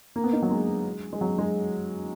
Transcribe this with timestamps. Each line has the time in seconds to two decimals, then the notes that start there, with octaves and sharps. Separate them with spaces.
0.16 A#3
0.24 B3
0.33 D#4
0.42 F#3
0.51 G#3
1.13 G#3
1.21 F#3
1.38 G#3